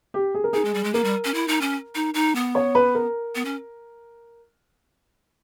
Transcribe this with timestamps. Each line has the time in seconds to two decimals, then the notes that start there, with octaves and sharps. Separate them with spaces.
0.14 G4
0.34 G#4
0.44 A#4
0.53 D#4 G#4
0.65 G#3
0.74 G3
0.84 G#3
0.94 A#3 A#4
1.04 G3
1.25 C#4
1.34 E4
1.48 D#4
1.61 C#4
1.95 D#4
2.14 D#4
2.35 B3
2.55 C#5
2.75 B4
2.95 A#4
3.35 B3
3.45 C#4